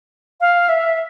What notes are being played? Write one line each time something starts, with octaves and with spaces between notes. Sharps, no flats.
F5
E5